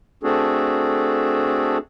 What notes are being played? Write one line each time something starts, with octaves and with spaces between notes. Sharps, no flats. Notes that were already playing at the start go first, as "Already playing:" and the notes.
A3 C4 D4 F#4 G#4 A4